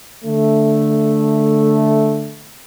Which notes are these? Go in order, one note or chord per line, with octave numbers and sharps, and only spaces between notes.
D3 A3